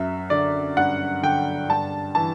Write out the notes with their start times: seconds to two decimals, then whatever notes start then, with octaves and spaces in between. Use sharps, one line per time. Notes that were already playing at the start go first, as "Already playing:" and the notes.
Already playing: F#2 E5
0.30 D3 D5
0.77 G2 F#5
1.23 D3 G5
1.69 G2 A5
2.15 E3 A5